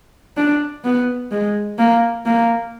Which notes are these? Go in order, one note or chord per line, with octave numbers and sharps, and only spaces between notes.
D4
B3
G#3
A#3
A#3